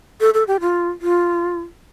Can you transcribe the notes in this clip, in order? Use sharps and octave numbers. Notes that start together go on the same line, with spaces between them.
A4
A4
G4
F4
F4